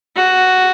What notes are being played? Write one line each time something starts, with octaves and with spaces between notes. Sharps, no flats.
F#4